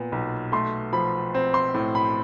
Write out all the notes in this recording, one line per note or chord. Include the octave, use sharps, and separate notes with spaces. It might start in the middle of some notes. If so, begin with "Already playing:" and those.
Already playing: A#2 B3
B1
A3 C6
F3 B5
C4
C6
A2
B5